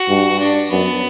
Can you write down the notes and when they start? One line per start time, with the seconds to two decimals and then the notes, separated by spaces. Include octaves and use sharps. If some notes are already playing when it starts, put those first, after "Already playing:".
Already playing: F#4
0.08 G2
0.40 D4
0.70 F#2 B3